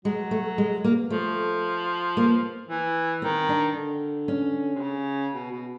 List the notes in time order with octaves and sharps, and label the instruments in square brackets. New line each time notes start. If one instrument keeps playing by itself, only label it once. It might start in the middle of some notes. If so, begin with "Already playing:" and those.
[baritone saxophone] F#3 [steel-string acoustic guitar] G#3
[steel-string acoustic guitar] A3
G#3
A#3
[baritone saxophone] F3 [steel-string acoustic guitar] A3
[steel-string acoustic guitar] A#3
[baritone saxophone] E3
[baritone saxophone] D#3 [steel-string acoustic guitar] C4
[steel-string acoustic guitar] D4
[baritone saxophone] D3
[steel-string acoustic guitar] C#4
[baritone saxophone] C3
C#3
B2
B2